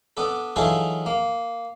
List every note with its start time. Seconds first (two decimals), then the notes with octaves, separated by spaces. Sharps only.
0.17 B3 D4 A4
0.56 E3 F#3 D#4 F4 G#4 A4
1.06 A#3